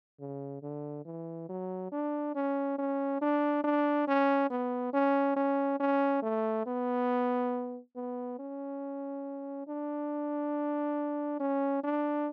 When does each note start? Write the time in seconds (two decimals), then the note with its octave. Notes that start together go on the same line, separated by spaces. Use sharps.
0.20 C#3
0.63 D3
1.05 E3
1.49 F#3
1.92 D4
2.35 C#4
2.79 C#4
3.22 D4
3.64 D4
4.08 C#4
4.51 B3
4.94 C#4
5.36 C#4
5.80 C#4
6.23 A3
6.67 B3
7.96 B3
8.39 C#4
9.67 D4
11.40 C#4
11.84 D4